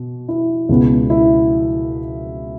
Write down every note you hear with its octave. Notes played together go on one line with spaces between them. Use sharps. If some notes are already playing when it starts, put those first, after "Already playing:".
Already playing: B2
E4
C#2 B2 B3
E4